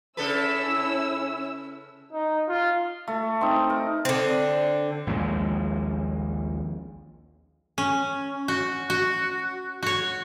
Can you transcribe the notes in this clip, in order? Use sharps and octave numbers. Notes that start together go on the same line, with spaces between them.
C#3 C#4 E4 A4 B4 E6
D#4
F4
A3
C4 D#4
A#4
D3 C4
A#1 D#2 A#2 G#3
C#4
F#4
F#4
F#4 C#5